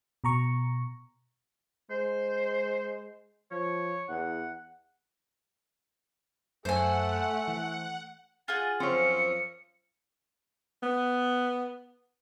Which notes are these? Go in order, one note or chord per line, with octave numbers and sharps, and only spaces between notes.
B2 A#5 C#6
G#3 C5
F3 C#5
E2 F#5
F#2 A3 C5 F#5 G#5
E3
F4 G#4 F#5 A6
F#2 F3 C4 C#5 C#7
B3